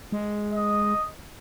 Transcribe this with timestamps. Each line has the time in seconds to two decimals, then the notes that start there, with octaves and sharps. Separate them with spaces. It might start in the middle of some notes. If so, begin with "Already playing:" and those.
0.12 G#3
0.54 D#5